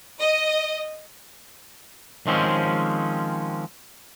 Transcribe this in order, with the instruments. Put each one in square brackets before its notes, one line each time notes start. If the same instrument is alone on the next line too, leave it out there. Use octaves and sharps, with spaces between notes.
[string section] D#5
[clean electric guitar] D#3 F3 G#3 C4 C#4